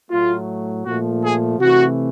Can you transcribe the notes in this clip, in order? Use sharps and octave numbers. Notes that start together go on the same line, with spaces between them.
A2 F#3 A3 F4
A#2 F3 A3 F#4
G#4
C3 E3 A3 F#4